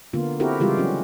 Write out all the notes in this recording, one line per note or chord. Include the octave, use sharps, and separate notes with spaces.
D3 A#3 B3 F4
C4 E4 F#4 G4 A4 A#4
C#3 E3 G3 G#3 F4 G4
F#3 C#4 F#4